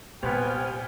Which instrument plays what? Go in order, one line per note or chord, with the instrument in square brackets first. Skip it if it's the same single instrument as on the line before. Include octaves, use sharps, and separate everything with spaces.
[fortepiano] C2 B3 [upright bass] A#2 [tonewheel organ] G4 C5 F6 [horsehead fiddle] G5 G#5